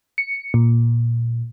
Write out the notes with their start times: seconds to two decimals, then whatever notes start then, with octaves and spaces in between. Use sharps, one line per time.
0.18 C#7
0.54 A#2